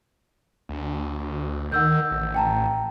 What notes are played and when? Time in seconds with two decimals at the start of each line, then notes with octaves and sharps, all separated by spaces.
0.69 D2
1.72 D#3 F#5 E6 G6
2.11 A1
2.35 G5 A5 A#5